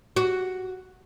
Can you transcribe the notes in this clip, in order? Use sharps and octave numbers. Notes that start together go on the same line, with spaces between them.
F#4